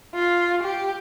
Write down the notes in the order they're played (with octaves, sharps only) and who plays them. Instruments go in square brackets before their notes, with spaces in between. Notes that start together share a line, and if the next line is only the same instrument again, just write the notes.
[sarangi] F4
G4